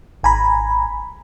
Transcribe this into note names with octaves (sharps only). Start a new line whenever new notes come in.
G#1 G#5 A#5 B5